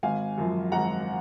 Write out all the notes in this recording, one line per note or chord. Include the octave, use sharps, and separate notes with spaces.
G#1 F5 G#5
F#2 F3
G#1 F#5 A#5